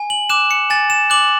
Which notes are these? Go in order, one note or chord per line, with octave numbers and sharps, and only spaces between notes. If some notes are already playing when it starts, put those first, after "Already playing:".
Already playing: G#5
F#7
D6 F#6 E7
C#7
G#5 A6
E7
D6 F#6 F#7